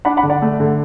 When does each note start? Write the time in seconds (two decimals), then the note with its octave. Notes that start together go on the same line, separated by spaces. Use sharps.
0.05 D4 F#5 B5
0.17 F#5 B5
0.23 D3
0.30 D5 F#5
0.42 A3
0.60 D3